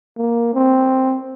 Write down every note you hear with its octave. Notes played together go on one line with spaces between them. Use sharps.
A#3
C4